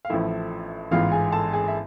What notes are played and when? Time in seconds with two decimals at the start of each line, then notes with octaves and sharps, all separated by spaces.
0.05 F5
0.09 A1 A2 F3 A3 E4 E5
0.91 A1 G#2 E3 B3 F4 F5
1.12 G#4 G#5
1.32 A4 A5
1.53 G#4 G#5
1.68 E5